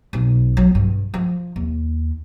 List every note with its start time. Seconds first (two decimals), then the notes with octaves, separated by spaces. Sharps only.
0.13 B1
0.57 F#3
0.75 G2
1.14 F3
1.56 D#2